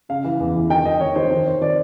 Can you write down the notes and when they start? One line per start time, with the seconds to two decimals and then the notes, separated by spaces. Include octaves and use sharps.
0.09 C#3 F5
0.24 E3
0.40 E2
0.56 E3
0.70 D#3 G5
0.86 D#3 D#5
1.00 D#3 C#5
1.16 D#3 C5
1.30 D#3 C5
1.46 C3 C#5
1.61 D#3 D5